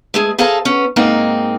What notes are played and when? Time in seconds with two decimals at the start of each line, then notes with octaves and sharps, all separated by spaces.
0.14 G#3 A3 G#4
0.39 G#4 A4 C5 F5 A5 A#5
0.65 B3 C#4
0.96 G#2 A#3 C4 D#4